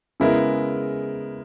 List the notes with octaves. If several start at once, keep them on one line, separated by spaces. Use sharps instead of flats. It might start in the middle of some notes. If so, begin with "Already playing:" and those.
C#3 G#3 B3 E4 A#4